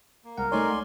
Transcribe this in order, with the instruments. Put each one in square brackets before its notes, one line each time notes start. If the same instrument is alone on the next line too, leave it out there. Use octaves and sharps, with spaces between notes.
[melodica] A#3
[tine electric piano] C2 G#3 F#5 [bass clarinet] A#4
[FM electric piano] A3 D#4 C#5 [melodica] D5 G#5 C6